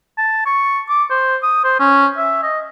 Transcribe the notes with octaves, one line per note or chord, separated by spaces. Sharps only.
A5
C#6
D6
C5
D#6
C5
C#4
E5
D#5